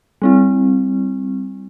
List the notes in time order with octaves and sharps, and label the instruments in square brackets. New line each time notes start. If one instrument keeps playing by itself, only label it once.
[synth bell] G3 C4 E4